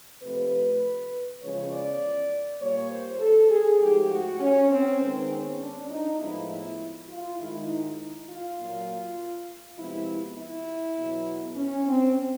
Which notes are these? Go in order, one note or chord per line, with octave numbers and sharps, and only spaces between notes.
C3 F3 A3 B4
E2 C#3 F3 G#3 C#5
D5
A#2 G3 A#3 C#5
C5
A4
G#4
G#2 F3 A3 G4
F#4
C#4
C4
G#2 D#3 G#3 B3 C4
C#4
D4
D#4
A2 F3 G#3 B3 E4
E4
F4
G#2 D#3 G#3 E4
D#4
F4
A#2 F#3 A#3
C3 F3 G#3 B3 E4
E4
E2 B2 F#3
C#4
C4